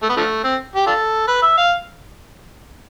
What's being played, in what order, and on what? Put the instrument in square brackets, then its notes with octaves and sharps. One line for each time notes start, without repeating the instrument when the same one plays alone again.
[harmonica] A3
B3
D3 F3 A3
C4
G4
D4 F4 A4
B4
E5
F5